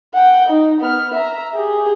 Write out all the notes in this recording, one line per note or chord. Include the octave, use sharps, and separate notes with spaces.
F#5 G5
D#4
B3 F6
E5 A#5
G4 G#4